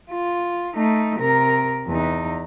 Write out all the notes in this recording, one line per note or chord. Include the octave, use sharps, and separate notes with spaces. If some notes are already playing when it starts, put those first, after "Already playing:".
F4
A3 D#4
C3 A#4
E2 D#4